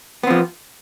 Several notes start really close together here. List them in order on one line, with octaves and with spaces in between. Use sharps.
B3 C4 F3